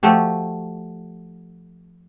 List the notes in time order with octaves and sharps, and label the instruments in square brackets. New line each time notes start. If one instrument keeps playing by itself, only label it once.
[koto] F3 A3 F#4 G4